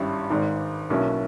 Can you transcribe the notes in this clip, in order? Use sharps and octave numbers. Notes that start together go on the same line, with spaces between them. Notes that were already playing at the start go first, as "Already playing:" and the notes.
Already playing: G#1 G2 G3 C#4 E4
G#1 G#2 D#3
B1 B2 A#3 C#4 E4